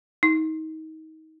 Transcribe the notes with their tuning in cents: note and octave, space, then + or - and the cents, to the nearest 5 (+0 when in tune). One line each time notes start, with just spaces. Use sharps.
D#4 +25